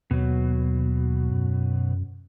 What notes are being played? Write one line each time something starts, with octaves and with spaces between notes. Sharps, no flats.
D#2 B2 F#3
F#2